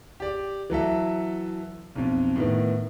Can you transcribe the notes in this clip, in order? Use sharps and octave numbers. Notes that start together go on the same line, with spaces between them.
G4 D5
E3 F#3 A4 E5
B1 F2
A2 D#3 B3